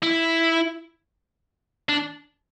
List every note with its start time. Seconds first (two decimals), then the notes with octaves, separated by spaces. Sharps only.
0.02 E4
1.89 D4